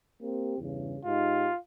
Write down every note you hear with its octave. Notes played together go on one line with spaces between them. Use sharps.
A#3 C4 G4
E2 G2 C#3
G#2 D#4 F4 G4